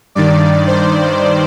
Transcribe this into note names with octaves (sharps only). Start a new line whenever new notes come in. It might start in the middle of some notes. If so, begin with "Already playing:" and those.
G2 D#3 D5
C5